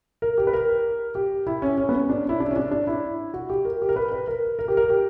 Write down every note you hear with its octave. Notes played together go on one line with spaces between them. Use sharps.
A#4
G4
B4
A#4
G4
E4
C#4
C#4
B3
C#4
D4
E4
D4
C#4
D4
D4
E4
F#4
G4
A#4
G4
A#4
B4
B4
A#4
A#4
G4
A#4
G4